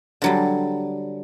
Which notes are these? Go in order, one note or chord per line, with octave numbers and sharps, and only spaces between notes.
D3 F#3 G3